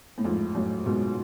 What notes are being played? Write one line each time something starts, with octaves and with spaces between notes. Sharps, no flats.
A2
F2 G#2
F#2 A2
G#2 B2